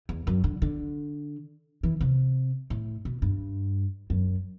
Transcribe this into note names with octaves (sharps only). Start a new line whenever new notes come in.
E2
F#2
D3
D3
E3
C3
A2
B2
G2
F#2